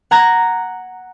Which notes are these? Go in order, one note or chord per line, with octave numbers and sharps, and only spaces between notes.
F#5 A#5 G#6 A#6